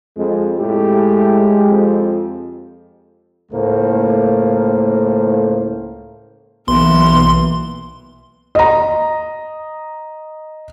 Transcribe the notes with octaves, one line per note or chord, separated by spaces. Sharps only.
F2 G#3
A2 G#3 G4
F2
C#2 A2 A3 A#3 C5
B1 E3 A#3 B3 C6
D#5 A#5